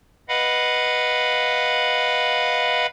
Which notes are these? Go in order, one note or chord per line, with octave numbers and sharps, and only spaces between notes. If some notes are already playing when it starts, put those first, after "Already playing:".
B4 D#5 F5 F#5 B5